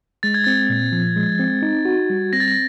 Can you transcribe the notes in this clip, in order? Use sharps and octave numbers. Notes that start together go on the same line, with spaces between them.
G#3 A6
G#6
C4 A6
A#2
F3
G#3
C4
D#4
F#4
G3
C4 A#6
A6
A#6
A6